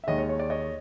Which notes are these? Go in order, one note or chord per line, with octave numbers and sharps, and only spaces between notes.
E5
D#2 D#3 G#3 C#5 D#5
C#5
C#5
D5
C#5 D#5